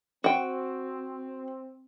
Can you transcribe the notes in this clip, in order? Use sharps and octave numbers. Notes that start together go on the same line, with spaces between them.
C4 F#4 G5